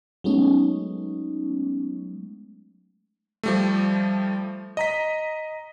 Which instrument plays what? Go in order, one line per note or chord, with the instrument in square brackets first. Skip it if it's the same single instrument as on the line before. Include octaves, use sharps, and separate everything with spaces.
[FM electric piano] F#3 G#3 A3 B3 C#4 D#4
[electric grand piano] F3 G3 A3
D#5 A#5 B6